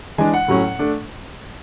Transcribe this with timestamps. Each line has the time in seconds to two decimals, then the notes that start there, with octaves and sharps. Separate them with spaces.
0.18 E3 G#3 D4 G#5
0.34 F#5
0.48 A2 F#3 C#4
0.79 A3 D4